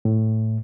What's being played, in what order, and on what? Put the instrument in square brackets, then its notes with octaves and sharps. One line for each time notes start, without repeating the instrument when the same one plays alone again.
[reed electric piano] A2